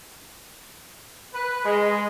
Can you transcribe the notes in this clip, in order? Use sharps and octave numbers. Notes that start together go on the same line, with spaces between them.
B4
G#3